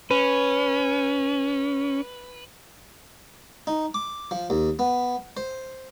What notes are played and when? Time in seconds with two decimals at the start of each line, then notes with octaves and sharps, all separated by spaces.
0.11 C#4 B4
3.67 D#4
3.94 D6
4.31 F3
4.50 D#2
4.79 B3
5.37 C5